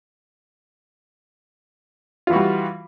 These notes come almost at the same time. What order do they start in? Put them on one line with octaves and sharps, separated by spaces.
F4 E3 F#4 G3